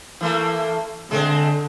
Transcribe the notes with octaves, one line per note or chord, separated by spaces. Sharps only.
E3 A3 A#3
D3 G#3 A3 C4